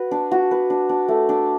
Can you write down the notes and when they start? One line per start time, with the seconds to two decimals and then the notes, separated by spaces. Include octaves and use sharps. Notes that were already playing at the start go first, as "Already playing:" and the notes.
Already playing: F#4 B4
0.11 D4
0.32 F#4
0.51 B4
0.70 D4
0.89 D4
1.08 A3
1.29 D4